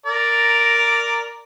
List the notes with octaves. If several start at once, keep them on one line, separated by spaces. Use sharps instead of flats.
A#4 D5 A#5